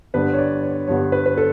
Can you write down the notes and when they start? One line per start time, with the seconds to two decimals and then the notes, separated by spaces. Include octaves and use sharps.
0.14 G2 D3 G3 B3 B4
0.33 C#5
0.38 D5
0.63 C#5
0.87 G2 D3 G3 B3 C#5
1.12 B4
1.26 B4
1.37 A4